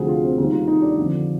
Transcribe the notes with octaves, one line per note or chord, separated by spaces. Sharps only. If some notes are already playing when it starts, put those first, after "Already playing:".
Already playing: D2 C3 F3 G#4
F4
C4
D#2 D#3 G3 C4
F4
D#4
D4
F2 D3 F3